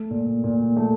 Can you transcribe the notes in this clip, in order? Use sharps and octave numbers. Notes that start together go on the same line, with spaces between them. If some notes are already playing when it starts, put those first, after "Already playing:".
Already playing: A3
A#2
A#2
A3